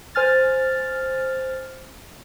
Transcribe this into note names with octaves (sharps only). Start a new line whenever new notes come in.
C5 G#5 F6 A6